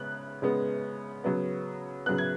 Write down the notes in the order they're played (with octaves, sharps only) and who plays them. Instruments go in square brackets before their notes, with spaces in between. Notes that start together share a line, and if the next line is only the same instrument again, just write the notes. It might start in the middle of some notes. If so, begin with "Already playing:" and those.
Already playing: [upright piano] C#3 G#3 B3 F#6
C#3 G#3 B3
C#3 F#3 B3
C#3 F#3 B3 F#6
G#6